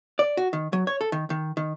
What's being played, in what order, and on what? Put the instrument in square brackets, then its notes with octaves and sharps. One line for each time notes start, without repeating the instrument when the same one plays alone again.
[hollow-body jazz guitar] D5
F#4
D#3
F#3
C#5
A4
D#3
D#3
D#3